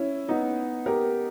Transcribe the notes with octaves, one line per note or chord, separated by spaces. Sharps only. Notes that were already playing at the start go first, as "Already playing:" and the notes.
Already playing: C#4 E4
B3 D#4
G4 A#4